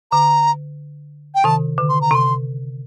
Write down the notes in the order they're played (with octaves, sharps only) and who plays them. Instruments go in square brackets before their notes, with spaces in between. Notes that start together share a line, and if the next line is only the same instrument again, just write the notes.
[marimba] D3 [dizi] A#5
[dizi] G5
[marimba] C3 D#3 [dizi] A5
[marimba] D3
[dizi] C6
A#5
[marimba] C3 [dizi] C6